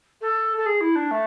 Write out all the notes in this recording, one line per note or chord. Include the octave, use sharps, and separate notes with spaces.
A4
A4
G#4
E4
D4
A3